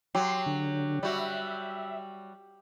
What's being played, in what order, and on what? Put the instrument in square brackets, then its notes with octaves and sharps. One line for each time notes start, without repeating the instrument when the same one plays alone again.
[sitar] F#3 [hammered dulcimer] G4 [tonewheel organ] C6
[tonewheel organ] D3
[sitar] G3 F#4 [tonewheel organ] E5